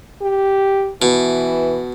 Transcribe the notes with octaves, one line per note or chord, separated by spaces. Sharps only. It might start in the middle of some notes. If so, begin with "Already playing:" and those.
G4
B2 E3